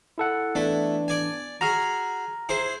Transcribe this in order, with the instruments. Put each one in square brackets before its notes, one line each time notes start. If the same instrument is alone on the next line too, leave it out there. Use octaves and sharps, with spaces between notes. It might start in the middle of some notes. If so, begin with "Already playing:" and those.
[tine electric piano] E4 A4 F#5
[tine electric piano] E3 B3 D4 [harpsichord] A3 E4
[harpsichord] D5 G#5
[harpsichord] F#4 G#4 [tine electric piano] A#5 F6
[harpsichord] E4 G#4 C5